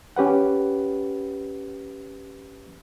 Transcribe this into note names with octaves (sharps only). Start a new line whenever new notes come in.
C#4 G4 B4 F#5